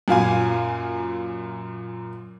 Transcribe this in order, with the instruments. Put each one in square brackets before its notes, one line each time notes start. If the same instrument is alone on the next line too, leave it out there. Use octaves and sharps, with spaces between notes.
[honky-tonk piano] F#2 A#2 F5 G#5